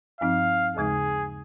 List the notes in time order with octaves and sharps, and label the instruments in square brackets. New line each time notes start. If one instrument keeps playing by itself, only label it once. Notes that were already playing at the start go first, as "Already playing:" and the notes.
[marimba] G2 F3 C4 D#4 [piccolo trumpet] F5
[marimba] D#2 C#3 G#3 D#4 [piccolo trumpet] G#4